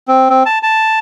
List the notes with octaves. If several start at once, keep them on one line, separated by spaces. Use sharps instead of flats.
C4
C4
A5
A5